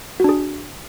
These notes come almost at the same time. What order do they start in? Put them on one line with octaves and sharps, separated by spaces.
F#4 D4 G#4